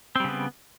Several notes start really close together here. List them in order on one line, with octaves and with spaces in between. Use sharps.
C4 G3 C#3 B3